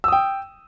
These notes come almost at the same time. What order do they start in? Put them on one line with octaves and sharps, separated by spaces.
E6 D#6 G5